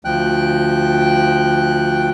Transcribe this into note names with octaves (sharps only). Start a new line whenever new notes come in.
D2 F3 G5 F#6